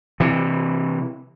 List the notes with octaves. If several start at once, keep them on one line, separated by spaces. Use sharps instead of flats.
C3 E3